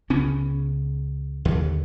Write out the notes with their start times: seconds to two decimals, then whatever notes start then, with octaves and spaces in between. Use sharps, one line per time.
0.10 C#2 C#3 B3 C#4
1.45 D#2 D3